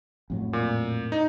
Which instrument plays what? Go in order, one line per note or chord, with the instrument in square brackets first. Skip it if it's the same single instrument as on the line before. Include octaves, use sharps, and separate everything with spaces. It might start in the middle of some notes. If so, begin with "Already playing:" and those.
[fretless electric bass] F2 A2 F#3
[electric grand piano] A#2
D#4